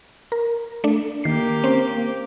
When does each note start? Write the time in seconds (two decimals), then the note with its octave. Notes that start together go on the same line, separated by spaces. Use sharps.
0.32 A#4
0.84 A3 D4
1.24 D#3 A#3 G4 C7
1.64 C4 C#4 C5